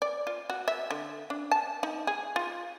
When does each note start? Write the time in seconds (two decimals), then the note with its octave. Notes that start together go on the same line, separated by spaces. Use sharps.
0.02 D5
0.27 F4
0.50 F#4
0.68 E5
0.91 D3
1.30 D4
1.52 A5
1.83 D#4
2.07 G#4
2.36 F4